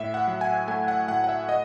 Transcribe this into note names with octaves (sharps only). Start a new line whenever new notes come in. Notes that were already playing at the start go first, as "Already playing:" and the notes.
Already playing: A2 E5
F#5
F#3
G#5
A3 G#5
F#5
A2 F#5
F#5
E5
D#5